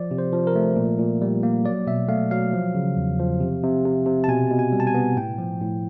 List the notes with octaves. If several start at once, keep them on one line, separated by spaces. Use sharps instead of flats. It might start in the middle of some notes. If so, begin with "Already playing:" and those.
Already playing: F3 D5
C3
C5
F3
A#4
A3
A#2
A#2
G3
A#3
F#3 D5
B2 E5
A3 F5
F#3 F5
F3
C#3
E2
F3
C3
C3
C3
C3
A5
B2 G#5
B2
G#5
G3
A5
G#5
B3
A2 G5
F3
A2